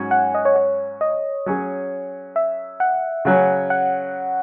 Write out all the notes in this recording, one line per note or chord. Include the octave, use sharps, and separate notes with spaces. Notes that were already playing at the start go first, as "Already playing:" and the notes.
Already playing: G#2 F#3 C#4 F#4 G#5
F#5
D#5
C#5
C#5
D#5
F#3 C#4 G#4
E5
F#5
C#3 F#3 C#4 F#5
F#5